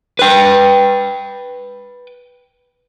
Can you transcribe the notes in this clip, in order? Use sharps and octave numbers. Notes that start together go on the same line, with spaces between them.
B4 G5